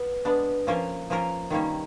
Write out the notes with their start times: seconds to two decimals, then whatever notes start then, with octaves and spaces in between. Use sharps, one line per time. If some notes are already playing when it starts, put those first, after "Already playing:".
Already playing: B3
0.25 G#3 B3 D4
0.67 F3 A#3 C#4 F4 A#4
1.10 F3 A#3 C#4 F4 A#4
1.50 D#3 G3 A#3 C#4